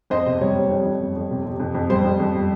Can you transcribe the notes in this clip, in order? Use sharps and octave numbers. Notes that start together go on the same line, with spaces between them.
F2 C5 D#5
C3
G3 C#5
G3
F2
F2
G3
F2
C3
C3
F2
F2
G3 C5
F2
F2
G3